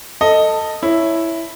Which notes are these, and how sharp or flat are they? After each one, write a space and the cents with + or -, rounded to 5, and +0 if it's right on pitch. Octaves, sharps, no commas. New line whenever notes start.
A4 +15 D#5 +0
E4 +0 C#5 +0